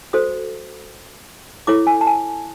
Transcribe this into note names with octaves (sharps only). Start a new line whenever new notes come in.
F#4 A4 C5 D#6
E4 A4 C#5 D6
G#5
A5
G#5